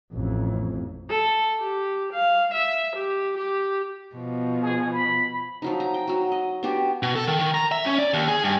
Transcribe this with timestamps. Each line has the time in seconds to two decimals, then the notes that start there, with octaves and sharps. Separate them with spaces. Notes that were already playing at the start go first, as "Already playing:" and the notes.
0.13 A1 F2
1.10 A4
1.60 G4
2.13 F5
2.54 E5
2.96 G4
3.38 G4
4.15 B2 F3
4.62 G#4
4.92 B5
5.62 F3 F#3 D#4
5.80 A#5
5.94 G5
6.07 F#3 F#4
6.32 D#5
6.63 B3 D4 F#4 G4
7.03 B2
7.16 A4
7.27 D#3
7.39 D#3
7.54 A#5
7.72 E5
7.86 C#4
7.99 D5
8.14 D#2
8.28 G#4
8.44 G2